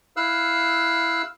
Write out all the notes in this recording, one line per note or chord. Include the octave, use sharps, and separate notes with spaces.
E4 F5 E6 F#6